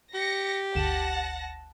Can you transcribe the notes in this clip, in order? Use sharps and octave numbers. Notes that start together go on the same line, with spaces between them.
G4 A#6 C#7
G1 D2 F#5 A5 A#6 E7